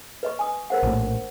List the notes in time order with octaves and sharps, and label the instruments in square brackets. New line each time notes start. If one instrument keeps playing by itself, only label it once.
[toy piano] B4 D#5 C#6
G#5 D#6
A#4 C5 F#5
[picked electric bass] A#1 A2